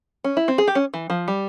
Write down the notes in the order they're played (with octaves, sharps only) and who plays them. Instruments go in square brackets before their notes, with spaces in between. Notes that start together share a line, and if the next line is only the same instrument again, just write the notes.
[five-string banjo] C#4
E4
C4
G#4
G4
C#4
E3
F3
G3